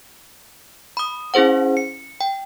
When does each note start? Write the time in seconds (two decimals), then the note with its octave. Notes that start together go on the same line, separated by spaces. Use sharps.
0.97 B5 D#6
1.34 C#4 E4 G#4 C5 F#5
1.77 C#7
2.21 G5